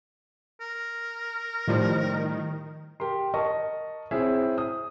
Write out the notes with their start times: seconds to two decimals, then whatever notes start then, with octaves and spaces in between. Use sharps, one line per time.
0.60 A#4
1.68 A2 D#3 F3 G3
3.00 G4 A#4 C6
3.34 A#4 D#5 A5 C#6
4.11 C4 E4 G#4 C#5 E5
4.58 D#6